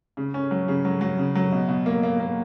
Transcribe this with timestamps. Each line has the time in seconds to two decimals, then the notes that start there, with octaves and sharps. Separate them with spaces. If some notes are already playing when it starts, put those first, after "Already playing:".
0.17 C#3
0.34 C#4
0.51 F#3
0.68 C#3
0.85 F#3
1.01 F#3
1.19 C#3
1.35 F#3
1.52 B2
1.69 B2
1.86 A#3
2.03 A#3
2.20 A#3